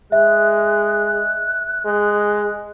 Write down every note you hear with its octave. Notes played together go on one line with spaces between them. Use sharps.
G#3 E5 F#6
G#3